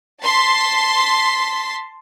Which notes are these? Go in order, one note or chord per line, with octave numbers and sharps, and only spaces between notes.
A5 C6 B6